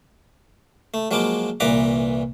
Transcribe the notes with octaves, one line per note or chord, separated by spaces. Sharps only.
A3
F3 F#3 G#3 A#3 D6
C2 A#2 E3 B4 A#5 D6